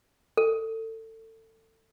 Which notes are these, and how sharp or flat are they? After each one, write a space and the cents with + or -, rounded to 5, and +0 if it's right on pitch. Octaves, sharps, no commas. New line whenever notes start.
A4 +25